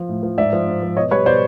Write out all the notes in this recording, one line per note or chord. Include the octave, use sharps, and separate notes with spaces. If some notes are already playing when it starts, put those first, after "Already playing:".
Already playing: F3
A2
F3
G#2 D5 E5
F3
G#2
F3
B2 C#5 D#5
G3 B4 C#5
B2 C5 D5